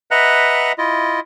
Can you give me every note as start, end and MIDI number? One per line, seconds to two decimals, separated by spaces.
0.11 0.72 71
0.11 0.72 75
0.11 0.72 76
0.11 0.72 78
0.11 0.72 82
0.11 0.72 90
0.78 1.20 64
0.78 1.20 65
0.78 1.20 75